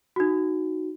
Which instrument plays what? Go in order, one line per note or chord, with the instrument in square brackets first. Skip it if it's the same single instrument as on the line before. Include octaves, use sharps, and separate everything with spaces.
[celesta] D#4 F#4